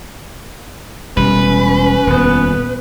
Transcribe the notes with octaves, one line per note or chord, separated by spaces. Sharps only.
E1 G3 C#4 B4
D#1 F2 B3